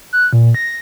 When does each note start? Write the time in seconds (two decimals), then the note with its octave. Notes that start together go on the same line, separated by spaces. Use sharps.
0.13 F#6
0.33 A#2
0.55 A#6